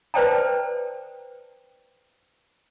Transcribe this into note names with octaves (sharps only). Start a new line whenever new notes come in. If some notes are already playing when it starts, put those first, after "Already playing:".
B4 C5 D5 G5 A5 A#5